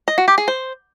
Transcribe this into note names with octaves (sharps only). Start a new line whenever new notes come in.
D#5
F#4
G4
G#4
C5